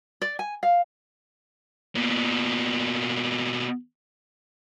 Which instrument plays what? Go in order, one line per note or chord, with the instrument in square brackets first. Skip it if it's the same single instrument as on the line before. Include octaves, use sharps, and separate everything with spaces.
[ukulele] D5
G#5
F5
[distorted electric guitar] B2 A#3